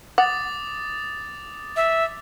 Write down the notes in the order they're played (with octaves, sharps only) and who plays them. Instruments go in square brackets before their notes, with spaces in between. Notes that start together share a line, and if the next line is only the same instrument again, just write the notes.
[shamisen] F#5 [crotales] D6 D#6 A6
[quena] E5